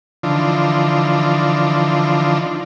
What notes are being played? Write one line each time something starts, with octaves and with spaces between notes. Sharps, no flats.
D3 E3 F3 D4 D#4 F4